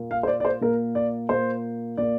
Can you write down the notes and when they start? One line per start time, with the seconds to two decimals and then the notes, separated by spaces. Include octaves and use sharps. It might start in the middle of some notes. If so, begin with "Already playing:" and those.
Already playing: A#2 A#3
0.11 F5
0.23 C5
0.28 D5
0.40 D5
0.45 C5
0.61 A#2 A#3 A#4
0.95 D5
1.29 A#2 A#3 C5
1.97 A#2 A#3 D5